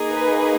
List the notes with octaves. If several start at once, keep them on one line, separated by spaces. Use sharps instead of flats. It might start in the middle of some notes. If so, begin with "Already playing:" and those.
Already playing: A#3 D#4 G#4
B4